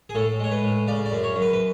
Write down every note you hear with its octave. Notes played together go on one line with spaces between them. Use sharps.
G#4
A2 A4
G#3 C#5
B4
A2
C#3 D5
D5
F#2
C#5
F#2
B4
B4